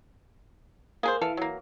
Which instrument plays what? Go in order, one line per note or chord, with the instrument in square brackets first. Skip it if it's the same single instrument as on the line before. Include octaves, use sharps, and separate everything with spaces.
[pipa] G#3 G#4 C5 [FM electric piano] A#3
[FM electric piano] E3 [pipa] A4 F5
[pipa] F#3 A#3